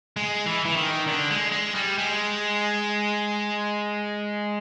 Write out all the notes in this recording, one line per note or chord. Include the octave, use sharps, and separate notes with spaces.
G#3
E3
E3
D#3
D3
G#3
G#3
G3
G#3